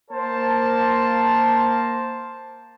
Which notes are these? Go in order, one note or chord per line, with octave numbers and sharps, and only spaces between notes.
A#3 A#4 C5 A5